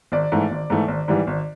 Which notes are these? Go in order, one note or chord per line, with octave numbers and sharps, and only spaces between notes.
G#1 D5
G#2 E3 A3
G#1
G#2 E3 A3
G#1
G#2 E3 G3
G#1